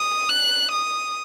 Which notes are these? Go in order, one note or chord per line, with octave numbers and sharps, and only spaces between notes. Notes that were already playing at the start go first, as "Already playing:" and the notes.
Already playing: D#6
F#6
D#6